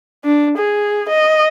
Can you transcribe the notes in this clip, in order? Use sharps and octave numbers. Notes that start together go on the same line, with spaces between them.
D4
G#4
D#5